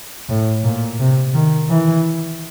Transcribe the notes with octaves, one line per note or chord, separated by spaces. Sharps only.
A2
A#2
C3
D#3
E3